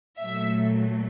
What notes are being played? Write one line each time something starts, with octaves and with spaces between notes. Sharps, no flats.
A#2 F#3 A3 E5